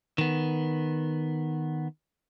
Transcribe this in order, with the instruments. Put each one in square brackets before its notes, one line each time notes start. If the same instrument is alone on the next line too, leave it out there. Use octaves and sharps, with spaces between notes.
[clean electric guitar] D#3 B3